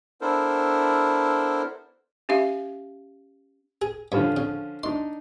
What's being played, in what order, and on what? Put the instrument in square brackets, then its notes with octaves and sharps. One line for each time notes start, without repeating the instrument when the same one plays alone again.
[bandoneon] B3 D4 E4 A4 A#4 C5
[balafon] C#4 G4 E5 F5
[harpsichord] G#4
[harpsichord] G2 [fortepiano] D3 F3 C#4
[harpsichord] C#3
[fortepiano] D4 D#4 [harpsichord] C6